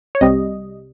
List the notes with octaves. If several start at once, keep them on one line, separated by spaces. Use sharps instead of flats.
C#5
C2 C3 G3 D#5